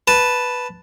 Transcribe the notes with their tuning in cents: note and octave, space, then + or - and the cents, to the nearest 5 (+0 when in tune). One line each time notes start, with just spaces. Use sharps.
B4 +0 A5 +0